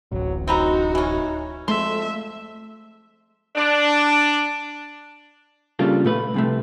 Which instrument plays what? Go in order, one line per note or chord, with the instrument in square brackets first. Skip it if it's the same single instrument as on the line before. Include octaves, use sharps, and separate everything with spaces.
[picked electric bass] D1 A1 [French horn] F#3
[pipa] C4 B4 A#5 [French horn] D#4 [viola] F#4
[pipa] E3 C#4 [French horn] D#4
[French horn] F2 [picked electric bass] G#3 A3 [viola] E5 [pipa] C6
[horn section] D4
[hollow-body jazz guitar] C#3 G3 A#3 D4 F4 A4
A#2 A3 B4
C2 C3 A3